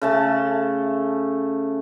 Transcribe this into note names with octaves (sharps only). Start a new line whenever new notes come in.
C#3 A3 A5